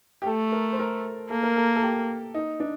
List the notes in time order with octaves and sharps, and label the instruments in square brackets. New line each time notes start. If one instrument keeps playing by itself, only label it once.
[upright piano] G4
[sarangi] A3 [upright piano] A4
[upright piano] A#4
C5
A#4
[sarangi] A#3 [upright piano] A4
[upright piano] A#4
A4
A4
G4
D#4
D4